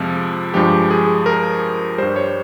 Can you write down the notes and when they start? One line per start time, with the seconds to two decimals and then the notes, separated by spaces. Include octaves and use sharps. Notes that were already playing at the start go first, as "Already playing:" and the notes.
Already playing: F2 C3 F3 G#3
0.54 G2 F3 G#3 G4
0.91 G#4
1.26 A#4
1.98 G2 G3 C5
2.16 C#5